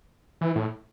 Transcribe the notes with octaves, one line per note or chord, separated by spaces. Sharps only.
E3
A2